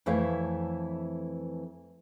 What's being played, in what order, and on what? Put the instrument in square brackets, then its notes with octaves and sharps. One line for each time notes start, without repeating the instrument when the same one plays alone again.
[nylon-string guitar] F2 E3 A3 E4 C#5 F5